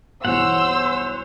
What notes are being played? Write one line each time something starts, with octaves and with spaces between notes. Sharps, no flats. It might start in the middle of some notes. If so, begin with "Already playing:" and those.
B1 G2 E3 C5 C#5 F#5 E6